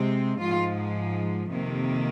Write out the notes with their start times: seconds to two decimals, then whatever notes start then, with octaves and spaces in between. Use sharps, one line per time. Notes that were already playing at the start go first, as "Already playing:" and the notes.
Already playing: C3 G#3 C4
0.39 G#2 F3 G#3 F4
1.49 F2 C3 D#3 A#3